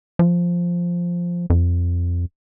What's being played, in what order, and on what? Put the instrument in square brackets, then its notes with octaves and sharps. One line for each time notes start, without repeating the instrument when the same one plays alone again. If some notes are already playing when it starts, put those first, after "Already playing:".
[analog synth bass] F3
F2